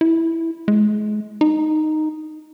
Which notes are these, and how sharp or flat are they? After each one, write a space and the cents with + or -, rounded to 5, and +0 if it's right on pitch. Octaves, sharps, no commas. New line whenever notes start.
E4 -5
G#3 +30
D#4 -5